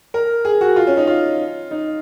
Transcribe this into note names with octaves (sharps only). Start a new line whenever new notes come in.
A#4
G#4
F#4
F4
C#4
D#4
F4
D#4